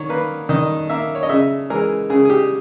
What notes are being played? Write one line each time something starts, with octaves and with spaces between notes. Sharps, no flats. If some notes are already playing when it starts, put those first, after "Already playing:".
Already playing: D#3 C#5
A#3 B4
D#3 D#5
A#3 E5
C#5
D#5
C#3 E5
E3 G#3 A#4
C#3 G#4
G#4
G4